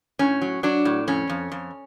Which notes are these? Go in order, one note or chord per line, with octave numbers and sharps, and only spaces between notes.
A2 C#4
F#3
F#3 D4
A2
F2 C#4
F2
F2